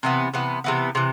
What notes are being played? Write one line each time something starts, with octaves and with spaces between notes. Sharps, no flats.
C3 E3 B3
C3 E3 B3
C3 E3 B3
C3 E3